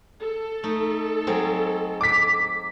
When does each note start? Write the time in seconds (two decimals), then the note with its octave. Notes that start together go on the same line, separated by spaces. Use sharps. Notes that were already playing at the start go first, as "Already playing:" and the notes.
0.20 A4
0.63 A3 D#4
1.27 F#3 G#3 C4
2.01 D6 B6